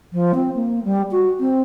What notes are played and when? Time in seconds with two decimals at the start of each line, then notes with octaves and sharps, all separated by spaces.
0.12 F3
0.34 C4
0.55 A#3
0.84 G3
1.11 F#4
1.39 C4